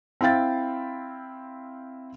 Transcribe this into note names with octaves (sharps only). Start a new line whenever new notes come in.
C4 E4 F5 G5 A6